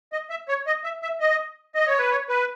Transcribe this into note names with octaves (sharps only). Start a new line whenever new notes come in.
D#5
E5
C#5
D#5
E5
E5
D#5
D#5
C#5
B4
C#5
B4